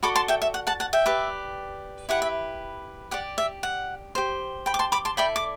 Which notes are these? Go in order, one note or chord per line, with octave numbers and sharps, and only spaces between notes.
F#4 A4 D5 B5 D6
A5 C6
E5 G5
E5
F#5
F#5 A5
F#5 A5
E5 G5
G4 B4 D5
E4 G4 B4 F#5
E5
G4 D5 F#5
E5
F#5
G4 C5
G5 B5
D6
A5 C6
B5 D6
A5 C6
E4 A4 D5 G5 B5
D6